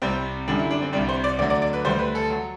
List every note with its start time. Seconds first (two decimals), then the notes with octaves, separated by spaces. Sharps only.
0.02 C2 C3 G3 C4
0.48 F#2 D3 G3 D4
0.59 E4
0.71 D4
0.82 C4
0.93 C2 C3 G3 D4
1.09 C5
1.24 D5
1.38 D2 D3 F#3 D5
1.50 D5
1.62 D5
1.73 B4
1.85 D2 D3 G3 C5
1.99 B4
2.15 A4
2.30 F#3